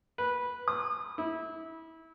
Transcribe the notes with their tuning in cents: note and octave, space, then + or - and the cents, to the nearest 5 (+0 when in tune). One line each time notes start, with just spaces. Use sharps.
B4 -10
D#6 -30
E4 -25